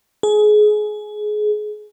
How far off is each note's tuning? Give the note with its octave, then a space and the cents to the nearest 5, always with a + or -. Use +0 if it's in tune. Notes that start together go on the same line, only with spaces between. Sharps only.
G#4 +25